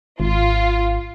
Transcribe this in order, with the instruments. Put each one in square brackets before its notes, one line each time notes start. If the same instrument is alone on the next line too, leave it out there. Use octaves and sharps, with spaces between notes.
[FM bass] G#1 [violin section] F4